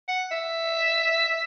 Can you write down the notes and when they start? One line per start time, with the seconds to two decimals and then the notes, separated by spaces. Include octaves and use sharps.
0.08 F#5
0.31 E5